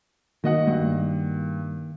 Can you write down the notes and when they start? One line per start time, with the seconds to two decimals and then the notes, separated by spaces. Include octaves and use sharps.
0.44 D#3 A#3 F#4 D#5 F#5
0.67 G2